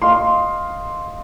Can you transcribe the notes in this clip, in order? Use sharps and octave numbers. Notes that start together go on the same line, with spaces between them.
D#5 F5 C6